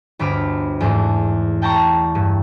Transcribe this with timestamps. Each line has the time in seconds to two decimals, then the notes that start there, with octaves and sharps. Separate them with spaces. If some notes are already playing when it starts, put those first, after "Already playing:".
0.19 G1 D2 B5 D6 F6
0.80 E2 G#2 E3 A3
1.62 G5 A5 A#5 C#6
2.15 G2